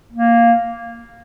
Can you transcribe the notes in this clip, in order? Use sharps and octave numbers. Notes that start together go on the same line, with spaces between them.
A#3